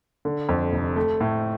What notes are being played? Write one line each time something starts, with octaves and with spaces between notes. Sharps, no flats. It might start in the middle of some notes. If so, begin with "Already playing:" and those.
D3
F2
F1
A3
A2